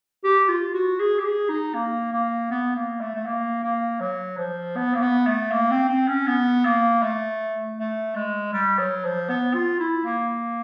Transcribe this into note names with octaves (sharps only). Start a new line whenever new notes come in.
G4
F4
F#4
G#4
G4
G#4
D#4
A#3
A#3
B3
A#3
A3
A3
A#3
A#3
F#3
F3
B3
A#3
B3
A3
A#3
C4
C4
C#4
B3
A#3
A3
A3
G#3
G3
F#3
F3
B3
F4
E4
A#3